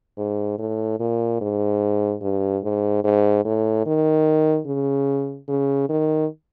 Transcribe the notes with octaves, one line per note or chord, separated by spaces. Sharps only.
G#2
A2
A#2
G#2
G2
G#2
G#2
A2
D#3
C#3
C#3
D#3